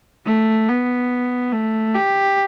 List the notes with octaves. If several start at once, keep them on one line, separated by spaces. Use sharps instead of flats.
A3
B3
A3
G4